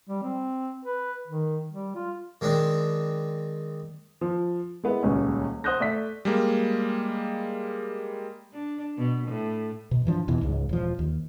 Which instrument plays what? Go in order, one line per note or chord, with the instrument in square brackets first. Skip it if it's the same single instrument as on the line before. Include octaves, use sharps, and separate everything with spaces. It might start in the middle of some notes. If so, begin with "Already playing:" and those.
[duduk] G3
C4
B4
D#3
G3
F4
[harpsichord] D#3 G#3 C4 D4
[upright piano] F3
G#3 B3 E4
D#1 C#2 C#4
C5 F#5 D#6 F#6 G6 A#6
A3 D5 E5 B6
[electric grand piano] G3 G#3 A#3
[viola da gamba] D4
B2
A2
[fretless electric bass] B2
G2 E3 F3 D4
E2 B2 E3
C#2 G#2 G#3
E1 F3
D#2